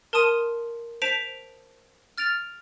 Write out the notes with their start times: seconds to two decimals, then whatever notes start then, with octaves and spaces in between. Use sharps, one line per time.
0.13 A#4 A5 C6 D#6 D#7
1.02 C5 A5 B6 D7 E7 F7
2.18 F6 A6 D7 F7